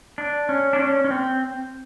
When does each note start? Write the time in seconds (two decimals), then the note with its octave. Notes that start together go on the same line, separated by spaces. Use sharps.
0.18 D4
0.49 C#4
0.73 D4
0.79 C#4
1.04 C#4
1.10 C4